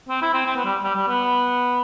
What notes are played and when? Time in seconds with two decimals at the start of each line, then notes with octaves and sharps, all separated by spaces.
0.09 C4
0.21 E4
0.33 C4
0.46 C4
0.55 B3
0.65 G3
0.84 G3
0.95 G3
1.08 B3